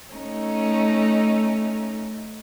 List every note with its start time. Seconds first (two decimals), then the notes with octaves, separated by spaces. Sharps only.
0.14 A3 C#4 D#4